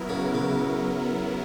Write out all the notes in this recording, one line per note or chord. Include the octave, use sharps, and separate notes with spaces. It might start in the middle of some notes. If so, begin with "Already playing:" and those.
Already playing: F#3 B3 E4 A#4
C#3
C#3